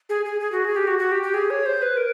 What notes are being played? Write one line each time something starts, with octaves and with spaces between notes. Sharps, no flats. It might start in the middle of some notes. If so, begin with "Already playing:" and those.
G#4
G#4
G#4
F#4
G#4
G4
F#4
F#4
G4
G4
G#4
C#5
C5
B4
A#4